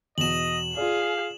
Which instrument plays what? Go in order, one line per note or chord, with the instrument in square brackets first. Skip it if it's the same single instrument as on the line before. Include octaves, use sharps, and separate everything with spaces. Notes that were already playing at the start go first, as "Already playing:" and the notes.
[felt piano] E2 B2 [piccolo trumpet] D#5 [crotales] E7 F#7
[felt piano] F4 D5 [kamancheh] G#4 [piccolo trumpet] F5